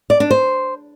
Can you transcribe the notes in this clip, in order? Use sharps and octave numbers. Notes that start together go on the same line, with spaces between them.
D5
D4
C5